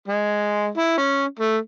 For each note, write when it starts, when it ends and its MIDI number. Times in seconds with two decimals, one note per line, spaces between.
0.08 0.72 56
0.77 0.95 64
0.97 1.24 61
1.39 1.57 57